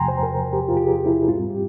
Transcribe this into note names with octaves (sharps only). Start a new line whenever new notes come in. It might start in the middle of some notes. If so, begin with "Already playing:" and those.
Already playing: E2 C3 F3 G5 G#5 A#5 C6
C5
A#4
G4
F4
G4
G#4
E4
G#2 G3 C4 F4
G4